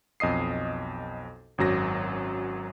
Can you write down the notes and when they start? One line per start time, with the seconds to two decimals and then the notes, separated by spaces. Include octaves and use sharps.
0.20 B1 F2 D#5 D#6 C7
1.58 G#1 F#2 F#3 A#6